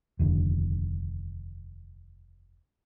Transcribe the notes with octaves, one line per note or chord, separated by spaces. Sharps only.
F1 D#2 D3